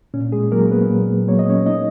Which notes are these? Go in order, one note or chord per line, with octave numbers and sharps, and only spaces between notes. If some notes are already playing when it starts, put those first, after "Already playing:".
A#2 C#4
G#3 G#4
F#3 A#3 A#4
B3 B4
A#2
F#3 A#3 C#5
D#5
C#4 C#5
D#4 D#5